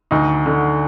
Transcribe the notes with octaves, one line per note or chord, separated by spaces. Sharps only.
D2 D#4
D3